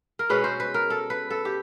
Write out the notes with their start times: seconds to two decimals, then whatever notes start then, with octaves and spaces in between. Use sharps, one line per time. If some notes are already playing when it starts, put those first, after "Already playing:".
0.19 A#4
0.29 B2 G#3 C#4 B4
0.44 C5
0.60 B4
0.74 A#4
0.90 A4
1.10 B4
1.30 A4
1.45 G4